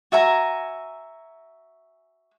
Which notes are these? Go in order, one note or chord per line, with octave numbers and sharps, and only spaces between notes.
F#4 E5 G#5 A#5